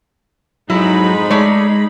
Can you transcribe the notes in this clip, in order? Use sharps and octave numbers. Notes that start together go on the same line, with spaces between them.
F2 G#2 F#3 D#4 E4 B5
G#3 A3 C#5 D5